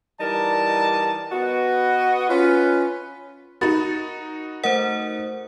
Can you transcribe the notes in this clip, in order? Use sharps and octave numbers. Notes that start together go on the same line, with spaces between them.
E3 G3 D#4 A#4 D5 A5
B3 F#4 D#5
C#4 F4 B4
D#4 F#4 A#4 B5 A6
A3 A#4 C5 D#5 F#5